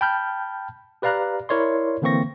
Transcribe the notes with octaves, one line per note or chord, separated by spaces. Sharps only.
G5 A5 B5 F6 G6
G4 B4 D5 F5 A#5 F#6
E4 A#4 C#5 D5 C6
D3 E3 A#3 C4 C#6 A#6